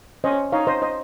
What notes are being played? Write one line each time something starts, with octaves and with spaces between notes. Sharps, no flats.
C#4 C5 D#5
D#4 C#5 F5
C5 D#5
C5 D#5